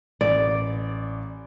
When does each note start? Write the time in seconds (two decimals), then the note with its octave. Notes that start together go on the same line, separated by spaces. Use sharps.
0.21 A1 D5